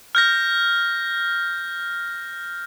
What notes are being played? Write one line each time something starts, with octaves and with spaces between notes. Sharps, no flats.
F6 G6 A#6